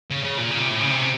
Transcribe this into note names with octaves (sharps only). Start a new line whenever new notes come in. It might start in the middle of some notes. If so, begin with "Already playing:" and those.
C#3
C#3
A#2
C#3
C3
A2
C#3
C3